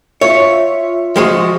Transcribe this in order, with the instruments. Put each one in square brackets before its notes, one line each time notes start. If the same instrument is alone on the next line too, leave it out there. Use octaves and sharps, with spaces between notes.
[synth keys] F4 E5 [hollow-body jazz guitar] C#5
[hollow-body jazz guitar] F3 G#3 F#4